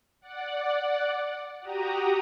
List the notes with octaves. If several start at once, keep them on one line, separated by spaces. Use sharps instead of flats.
D5 F#5
F#4 G4 A#5 D#6